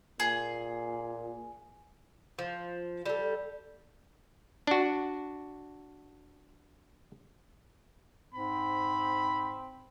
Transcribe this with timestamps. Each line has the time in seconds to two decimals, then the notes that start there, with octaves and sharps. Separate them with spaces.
0.20 A#2 G#4
2.39 F3
3.06 G3 A4
4.67 D4 F#4
8.34 G#2 C4 B5